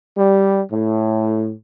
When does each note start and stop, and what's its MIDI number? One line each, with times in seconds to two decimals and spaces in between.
0.17 0.61 55
0.70 1.51 45